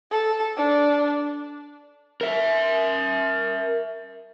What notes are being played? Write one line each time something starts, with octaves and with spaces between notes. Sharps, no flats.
A4
D4
A#4 E5